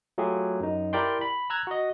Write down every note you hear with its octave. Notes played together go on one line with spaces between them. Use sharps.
F#3 A3 F4 G4 G#4
F#2 D#4
E4 G4 A#4 D5 G5 C6
B5
A#5 E6 F#6 G#6
F#4 D#5